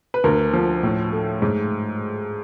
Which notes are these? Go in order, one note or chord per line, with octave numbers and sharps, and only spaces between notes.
B4
D2 A#4
F3
A2
A3
G#2